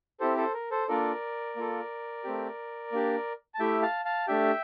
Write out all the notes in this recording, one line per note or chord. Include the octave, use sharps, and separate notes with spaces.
C4 E4 G4 A4 C5
A4 C5
A#4
A4 C5
A#3 D4 F4 A4 A#4 D5
A#3 F4 A4
A3 C4 G4
A#3 D4 G4
A5
A3 E4 G4 E5 G5
F5 A5
F5 A5
A3 D4 G4 E5 G5